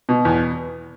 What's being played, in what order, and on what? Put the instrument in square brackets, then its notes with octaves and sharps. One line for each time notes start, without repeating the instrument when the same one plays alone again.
[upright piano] B2
E2